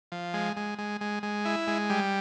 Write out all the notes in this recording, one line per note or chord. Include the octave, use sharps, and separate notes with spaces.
F3
G#3
G#3
G#3
G#3
G#3
E4
G#3
G3